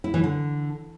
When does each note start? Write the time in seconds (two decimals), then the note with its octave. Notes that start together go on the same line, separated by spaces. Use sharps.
0.04 E4
0.14 E3
0.23 D3